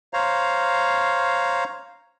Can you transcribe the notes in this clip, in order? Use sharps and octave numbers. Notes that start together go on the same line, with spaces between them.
C5 C#5 F5 A#5